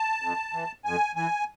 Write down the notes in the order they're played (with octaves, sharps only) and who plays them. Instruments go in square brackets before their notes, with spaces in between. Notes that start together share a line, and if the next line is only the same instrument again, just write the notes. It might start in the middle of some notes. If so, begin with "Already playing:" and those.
Already playing: [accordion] A5
F2
E3
F2 G#5
E3 G#5